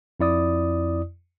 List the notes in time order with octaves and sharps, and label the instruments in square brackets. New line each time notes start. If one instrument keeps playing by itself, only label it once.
[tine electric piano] F2 E4 D5 D#6